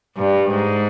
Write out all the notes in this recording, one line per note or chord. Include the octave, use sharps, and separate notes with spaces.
G2
G#2